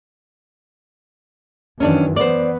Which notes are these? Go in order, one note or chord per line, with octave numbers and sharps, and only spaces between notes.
F#2 D#3 E3 C#4 D4 D5
E3 B3 C5 D5